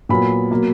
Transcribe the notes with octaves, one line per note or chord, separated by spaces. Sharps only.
A#2 F#3 B3 B5
B2 F#3 A#3